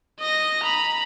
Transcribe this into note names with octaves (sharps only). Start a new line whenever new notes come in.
D#5 A#6
A#5 B5